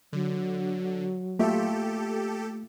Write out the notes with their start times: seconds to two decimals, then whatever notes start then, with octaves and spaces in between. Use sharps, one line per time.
0.13 D3 F#3
1.39 A3 A#3 F4 G4 A4 E5